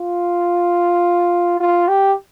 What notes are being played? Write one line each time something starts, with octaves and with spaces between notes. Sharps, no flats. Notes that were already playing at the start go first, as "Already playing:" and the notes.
Already playing: F4
F4
G4